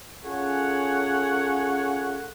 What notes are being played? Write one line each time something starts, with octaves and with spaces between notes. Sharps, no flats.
C#4 F4 G#4 A4 C#5 F#5